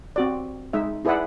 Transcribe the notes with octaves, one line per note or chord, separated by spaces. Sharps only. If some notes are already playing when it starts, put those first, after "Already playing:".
C4 F#4 D5
G#3 D#4 E5
E4 G#4 B4 D5 E5 F#5